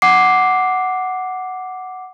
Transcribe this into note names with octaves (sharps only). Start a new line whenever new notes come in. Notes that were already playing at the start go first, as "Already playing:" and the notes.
F#5 D6 C7